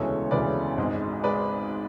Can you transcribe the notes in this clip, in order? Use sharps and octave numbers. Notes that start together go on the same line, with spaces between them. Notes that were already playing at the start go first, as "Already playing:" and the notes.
Already playing: E1 D2 C#3 E3 G#3 A4 C#5
E1 D2 C#3 E3 G#3 B4 D5
G#1 G#2 G#3
G#3 B4 D5